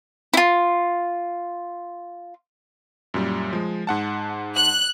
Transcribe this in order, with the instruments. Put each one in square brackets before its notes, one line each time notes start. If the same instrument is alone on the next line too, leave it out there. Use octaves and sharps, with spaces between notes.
[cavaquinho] E4 F4
[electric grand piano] F#2 A#2 G3
F3 G#3
G#2 F#5 A5
[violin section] F#6